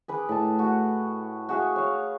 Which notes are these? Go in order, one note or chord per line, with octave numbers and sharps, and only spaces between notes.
G#4 B4 D6
A2 D#5 A5
F#4
F#4 G#4 E5 F5
C#5 F5